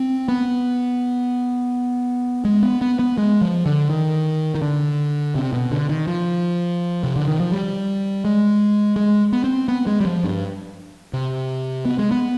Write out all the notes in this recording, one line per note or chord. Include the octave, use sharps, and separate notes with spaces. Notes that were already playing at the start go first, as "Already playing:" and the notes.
Already playing: C4
B3
G#3
B3
B3
B3
G#3
F3
D3
D#3
D#3
D3
C3
B2
D3
D#3
F3
C3
D3
D#3
F3
G3
G#3
G#3
B3
C4
B3
G#3
G3
F3
G2
C3
B3
G#3
B3